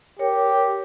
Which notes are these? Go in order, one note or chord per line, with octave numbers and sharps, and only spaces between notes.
G4 A#4 C#5